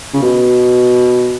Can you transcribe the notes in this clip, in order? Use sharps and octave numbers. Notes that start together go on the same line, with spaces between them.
C#3
B2